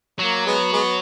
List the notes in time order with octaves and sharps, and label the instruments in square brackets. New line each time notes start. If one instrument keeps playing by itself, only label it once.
[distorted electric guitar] F#3 [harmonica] A#3
[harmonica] G#3 B3
G#3 B3